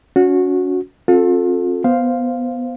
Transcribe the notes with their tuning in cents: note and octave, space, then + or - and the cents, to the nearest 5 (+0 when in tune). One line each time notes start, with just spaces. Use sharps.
C#4 +30 F#4 -20
C4 +45 F4 +40 A4 +0
B3 +0 C5 +0 F5 +0